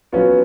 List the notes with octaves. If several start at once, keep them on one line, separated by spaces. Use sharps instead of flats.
F#3 B3 C#4 F4